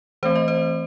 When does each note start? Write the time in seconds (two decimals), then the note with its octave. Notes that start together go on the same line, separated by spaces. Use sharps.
0.23 E3 A3 C4 C5
0.35 D#5
0.48 C5